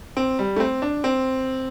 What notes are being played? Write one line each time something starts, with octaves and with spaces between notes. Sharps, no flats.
C4
G3
A3
C4
D4
C4